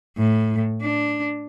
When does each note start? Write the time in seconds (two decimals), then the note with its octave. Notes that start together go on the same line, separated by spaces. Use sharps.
0.18 A2
0.82 D4